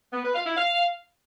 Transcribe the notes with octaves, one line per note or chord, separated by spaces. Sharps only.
B3
B4
F5
E4
F5